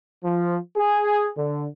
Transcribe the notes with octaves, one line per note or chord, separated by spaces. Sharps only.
F3
G#4
D3